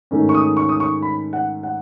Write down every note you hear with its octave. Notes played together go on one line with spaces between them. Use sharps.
G#2 D#3 A3 C#4
C#6
D#6
C#6
D#6
C#6
B5
F#5
F#5